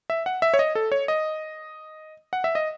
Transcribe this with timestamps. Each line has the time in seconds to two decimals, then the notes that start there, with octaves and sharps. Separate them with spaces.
0.10 E5
0.26 F#5
0.42 E5
0.54 C#5
0.59 D#5
0.75 A4
0.92 C#5
1.08 D#5
2.33 F#5
2.44 E5
2.55 D#5